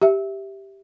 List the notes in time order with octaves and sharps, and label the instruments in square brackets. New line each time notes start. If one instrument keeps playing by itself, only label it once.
[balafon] G4 E5